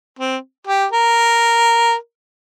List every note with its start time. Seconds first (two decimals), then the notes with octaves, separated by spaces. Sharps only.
0.19 C4
0.67 G4
0.92 A#4